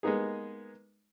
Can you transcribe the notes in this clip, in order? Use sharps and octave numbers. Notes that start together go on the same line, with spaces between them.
G#3 A#3 B3 D#4 G#4